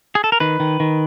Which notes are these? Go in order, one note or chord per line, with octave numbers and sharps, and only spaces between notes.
G#4
A4
A#4
D#3 B4
D#3
D#3